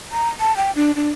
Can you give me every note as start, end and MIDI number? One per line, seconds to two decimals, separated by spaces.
0.12 0.29 82
0.40 0.55 81
0.57 0.71 79
0.76 0.95 62
0.95 1.10 62